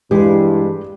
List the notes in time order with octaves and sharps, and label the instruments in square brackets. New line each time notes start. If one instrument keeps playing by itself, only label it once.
[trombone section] G2 [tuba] E3 [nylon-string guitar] G#3 [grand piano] G4 B4